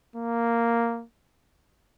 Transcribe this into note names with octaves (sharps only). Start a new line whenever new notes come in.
A#3